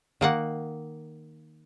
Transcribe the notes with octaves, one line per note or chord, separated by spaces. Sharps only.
D#3 A#3 F#5